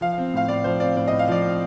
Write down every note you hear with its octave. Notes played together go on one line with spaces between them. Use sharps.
F3 F5
F5
C4
A2 F5
A2 D5
F3 C5
C4 D5
A2 D5
A2 D#5
F5
F3 D5
C4